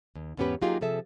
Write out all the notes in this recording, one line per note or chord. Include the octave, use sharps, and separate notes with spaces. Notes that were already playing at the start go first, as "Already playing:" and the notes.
D#2
E2 G#2 B3 C#4 G4 B4
F#3 A#3 D#4 F4 G4 G#4
C3 F3 G#4 A4 E5